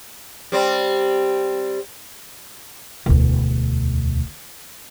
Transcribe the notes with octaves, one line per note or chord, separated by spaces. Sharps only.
G3 C4
E1 D2